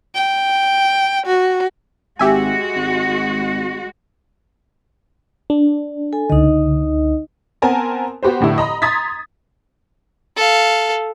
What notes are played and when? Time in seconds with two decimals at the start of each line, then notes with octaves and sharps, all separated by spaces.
0.15 G5
1.26 F#4
2.19 G#1 G#3 F#4 G4 E5 G#5
2.75 G#1
5.50 D4
6.13 A4 G#5
6.30 C#2 D3 D#4 D#5
7.62 B3 C4 A#4 G#5 A5
8.23 B3 F#4 G4 B4 C5
8.40 F1 A2 D3 E4 G4
8.58 D#5 A#5 B5
8.82 A#5 C6 D#6 G#6 A6 B6
10.37 A4 F5